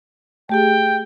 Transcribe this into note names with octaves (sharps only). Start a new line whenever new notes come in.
A3 G4 G#4 G5